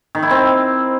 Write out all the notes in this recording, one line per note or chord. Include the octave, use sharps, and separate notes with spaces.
D#3
E4
C4